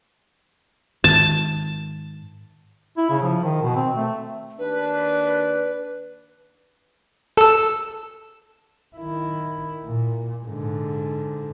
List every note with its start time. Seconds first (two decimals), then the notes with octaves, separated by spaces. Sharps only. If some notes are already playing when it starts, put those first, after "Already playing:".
1.04 G#2 D#3 A5
2.97 E4
3.10 C#3
3.22 F3
3.43 D#3
3.63 B2
3.76 C4
3.95 A3
4.59 D#2 D4 B4
7.37 A4 E6
8.97 D#3 E4
9.86 A#2
10.46 G#2 D3